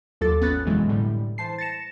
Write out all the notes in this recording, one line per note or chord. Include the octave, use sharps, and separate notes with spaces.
D#2 F#3 F4 A4 D6 A6
G#1 B3 C#4 F#6 A6
F2 B2 E3 F#3 G#3
A2 D3 G3
E3 C5 A5 C7
A6 A#6 C#7 E7